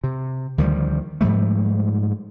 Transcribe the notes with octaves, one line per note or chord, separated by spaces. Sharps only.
C3
D2 D#3 F3 G3
G#2 F3 G3 A3